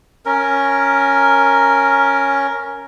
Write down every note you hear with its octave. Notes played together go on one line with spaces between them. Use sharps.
C#4 A#4